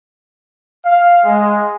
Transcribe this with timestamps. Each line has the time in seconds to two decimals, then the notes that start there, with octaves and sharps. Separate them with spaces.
0.84 F5
1.23 G#3